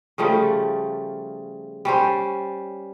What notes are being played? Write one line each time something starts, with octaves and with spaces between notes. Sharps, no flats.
C#3 F3 G3 A3
G3 C#4 C5